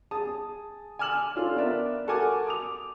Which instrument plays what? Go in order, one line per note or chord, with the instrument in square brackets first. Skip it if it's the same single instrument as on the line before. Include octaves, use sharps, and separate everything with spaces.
[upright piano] G#4 A5 D#6
G#5 D6 E6 F6 E7 F#7
C#4 D4 F4 A4
B3 D4 A#4 D5 E5
F#4 A4 A#4 F#5 G#5 D6
D6 D#6 F7